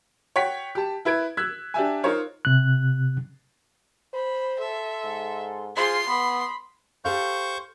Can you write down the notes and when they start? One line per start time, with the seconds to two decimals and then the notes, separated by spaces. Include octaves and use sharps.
0.36 C#5 F#5 G5 B6
0.75 G4 A5
1.05 E4 B4 G#6 D7
1.37 E6 F#6 G#6 B6
1.74 D4 G4 E5 G#5
2.03 D#4 F4 A#4 C5 C#5 F5
2.45 C3 F#6
4.14 C5 B5
4.59 A4 E5 C6
5.04 G#2
5.76 F4 G#4 C5 C6
6.08 B3 B5 D#6
7.05 G4 A4 C5 F5 C#6 G6